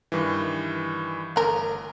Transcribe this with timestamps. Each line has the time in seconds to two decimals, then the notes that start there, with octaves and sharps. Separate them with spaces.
0.12 G2 D#3 E3
1.36 G1 A3 A#4